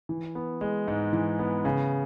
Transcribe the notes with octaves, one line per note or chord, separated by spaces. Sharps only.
E3
B3
G#3
G#2
E3
B3
C#3